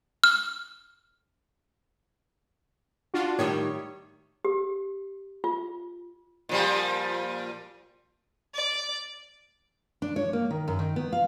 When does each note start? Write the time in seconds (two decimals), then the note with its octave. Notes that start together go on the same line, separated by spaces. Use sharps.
0.24 F6
3.14 D4 F4 F#4
3.39 A2 D#3 G3 C#5
4.45 G4
5.44 F4
6.49 A#2 F3 G3
8.55 D5
10.02 D4
10.16 C#5
10.33 A#3
10.50 D#3
10.68 F#2
10.79 D#3
10.96 B3
11.13 F5